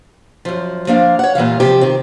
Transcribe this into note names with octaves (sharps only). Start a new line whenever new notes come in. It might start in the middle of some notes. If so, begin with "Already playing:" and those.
F#2 F3
F3 A#3 D4 F5
C#5 F#5
A#2 E3 G3 F5
C3 F3 G4
D#3 C4